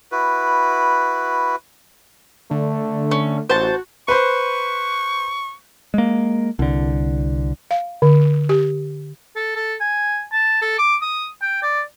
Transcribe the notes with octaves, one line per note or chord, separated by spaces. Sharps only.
E4 F#4 B4
D3 A3
C#4
A1 F#4 C5 A5
B4 C5 C#6
G#3 A#3
C2 D3
F5
D3
G4
A4
A4
G#5
A5
A4
D6
D#6
G5
D5